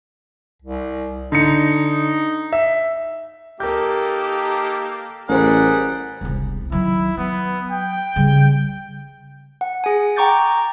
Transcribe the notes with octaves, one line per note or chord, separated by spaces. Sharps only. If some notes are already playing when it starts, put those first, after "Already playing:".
C2
D3 D#4 C#7
E5
A#3 D#4 G4 A4 A#4 G6
A1 G3 G#4 A#4 C5 F#5
E1 C2
D#3 F#3 E4
F#3 B3
G5
C#3 G3
F#5
G#4 G#5
G5 A#5 C#6 D6 G6 A6